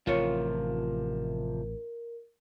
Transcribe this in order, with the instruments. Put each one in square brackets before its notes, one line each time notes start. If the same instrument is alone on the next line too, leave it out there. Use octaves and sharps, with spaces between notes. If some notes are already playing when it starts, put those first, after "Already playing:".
[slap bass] A1 [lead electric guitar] C3 F3 [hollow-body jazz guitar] F4 C#5 [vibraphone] A#4